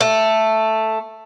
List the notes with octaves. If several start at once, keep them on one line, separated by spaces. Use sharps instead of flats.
A3